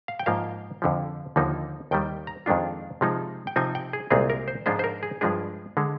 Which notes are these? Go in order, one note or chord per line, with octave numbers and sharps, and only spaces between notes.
F5
G5
G#2 F3 A#3 F5
F2 D3 F3
D#2 D3 F3 A#3 D#4
D#2 D#3 G3 G5
A#5
F2 D#3 G#3 D4 F4
C3 F3 G#3 D#4
G5
C3 F3 C4 D#4 G#5
G5
G#4
C2 A#2 G#3 C4 F4 G#4
A#4
C5
G#2 F3 G#3 D4 F4 C5
C5
A#4
G#4
G2 F3 G#3 D4 G#4
D3 G#3